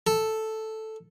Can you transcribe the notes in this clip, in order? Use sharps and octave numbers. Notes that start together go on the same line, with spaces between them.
A4